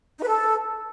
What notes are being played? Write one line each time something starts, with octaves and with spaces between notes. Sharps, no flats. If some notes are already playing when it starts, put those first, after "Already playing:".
D#4
B4
A4